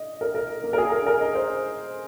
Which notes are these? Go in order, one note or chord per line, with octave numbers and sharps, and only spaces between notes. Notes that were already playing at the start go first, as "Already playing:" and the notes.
Already playing: D#5
A#4
A#4
A#3
A#4
G#4
A#4
A#4
D#5
C5